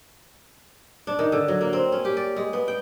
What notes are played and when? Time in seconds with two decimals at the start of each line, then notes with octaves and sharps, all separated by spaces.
1.07 D4
1.19 D#3
1.32 D3
1.48 F#3
1.61 A#3
1.73 C4
1.92 C#4
2.05 G4
2.17 D5
2.36 G#3
2.53 B3
2.68 G5